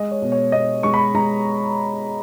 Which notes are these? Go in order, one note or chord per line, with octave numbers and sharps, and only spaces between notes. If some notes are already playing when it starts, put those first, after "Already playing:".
Already playing: G#3 D#5
C#5
B2
C#5
B2 D#5
G#3 C#6
B5
G#3 A#5